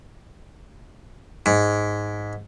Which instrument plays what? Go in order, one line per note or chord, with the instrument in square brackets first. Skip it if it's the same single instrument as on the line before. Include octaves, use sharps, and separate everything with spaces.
[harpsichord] G#2